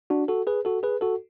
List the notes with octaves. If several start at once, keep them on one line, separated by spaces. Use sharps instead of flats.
D4 F#4
F#4 A4
G#4 B4
F#4 A4
G#4 B4
F#4 A4